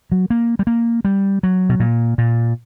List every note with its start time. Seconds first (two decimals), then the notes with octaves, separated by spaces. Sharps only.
0.12 F#3
0.30 A#3
0.59 G3
0.67 A#3
1.05 G3
1.43 F#3
1.69 B2
1.80 A#2
2.18 A#2